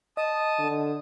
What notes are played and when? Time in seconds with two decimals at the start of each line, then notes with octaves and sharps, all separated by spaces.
0.17 D#5 A5 D#6
0.59 D3